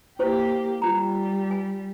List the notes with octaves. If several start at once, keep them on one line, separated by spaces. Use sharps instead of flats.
A#3 E4 G4 C5 C#6
G3 F4 A#5
G#5